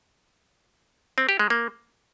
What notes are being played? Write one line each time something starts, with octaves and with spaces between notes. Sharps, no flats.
C4
G4
G#3
A#3